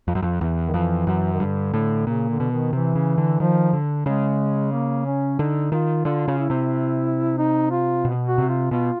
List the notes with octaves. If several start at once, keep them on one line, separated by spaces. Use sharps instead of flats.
F2
F#2
F2
E2
D#3
F2 E3
F#2
D#3
G2 D3
A2
A#2 C#3
D3
B2
D#3
C3 E3
C#3
D3
D#3 F3
D3
C#3 G#3
A#3
C#4
D3 D#4
D#3 F4
D3 F4
C#3
E4
C3
D#4
F4
B2
F#4
C3
F4
B2 F4